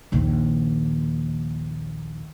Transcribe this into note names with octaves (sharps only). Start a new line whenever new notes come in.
A#1 D#2